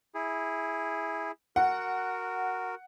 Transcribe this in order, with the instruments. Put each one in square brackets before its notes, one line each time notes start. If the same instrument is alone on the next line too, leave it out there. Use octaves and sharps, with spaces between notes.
[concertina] E4 G#4
[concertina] F#4 A#4 [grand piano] F#5